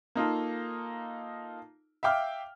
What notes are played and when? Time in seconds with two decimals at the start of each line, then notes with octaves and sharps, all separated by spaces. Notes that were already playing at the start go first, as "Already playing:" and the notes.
0.15 A#3 D#4 F4 A4
2.03 E5 F5 G5 D6 F6